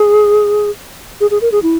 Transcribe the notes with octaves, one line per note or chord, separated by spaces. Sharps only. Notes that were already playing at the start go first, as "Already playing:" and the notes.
Already playing: G#4
G#4
G#4
A#4
G#4
E4